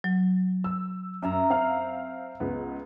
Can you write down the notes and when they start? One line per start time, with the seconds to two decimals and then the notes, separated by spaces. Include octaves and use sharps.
0.04 F#3
0.64 E6
1.22 F#2 A#4 E5 A#5
1.50 C4 F5 F6
2.40 C#2 B3